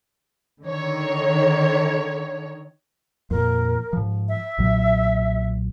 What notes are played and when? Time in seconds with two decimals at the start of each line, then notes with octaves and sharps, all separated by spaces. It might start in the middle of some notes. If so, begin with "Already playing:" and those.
0.62 D3 D#3 C#5
3.31 F2 A#2 A#4
3.93 G#2 F3
4.29 E5
4.58 B1 A#2 F#3